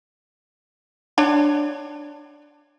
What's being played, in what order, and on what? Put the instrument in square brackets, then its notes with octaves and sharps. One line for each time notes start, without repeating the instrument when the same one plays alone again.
[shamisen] D4 C#5 D5